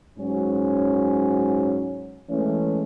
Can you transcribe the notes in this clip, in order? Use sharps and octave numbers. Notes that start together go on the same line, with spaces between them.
G#2 F#3 C#4
E3 G#3 A3 C#4